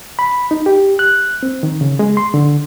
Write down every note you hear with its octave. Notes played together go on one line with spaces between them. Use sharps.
B5
D#4
G4
F#6
C4
D#3
C#3
G#3
C6
D3